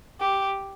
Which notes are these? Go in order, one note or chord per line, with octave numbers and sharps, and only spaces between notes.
G4